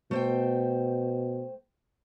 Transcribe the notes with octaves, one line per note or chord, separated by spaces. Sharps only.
B2 A3 C5 G5